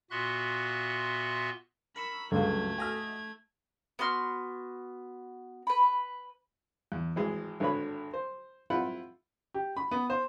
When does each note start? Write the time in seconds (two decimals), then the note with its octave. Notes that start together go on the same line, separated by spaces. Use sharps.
0.11 A#2 B3 F#4 E5 C6 F#6
1.96 A#4 B5 C#6 E6
2.32 C#2 G2 F#3 G#3 A3 A4 F5 G#6
2.78 F#4 D#5 E5 G#5 F6
3.99 B3 F#4 C6 F6
5.67 B4 B5
6.92 E2
7.16 G#1 E3 G#3
7.60 G#1 D3 B4 C#5 B5
8.14 C5
8.70 C4 E4 F4 F#5 B5
9.54 G4
9.77 B5
9.91 B3
10.10 C5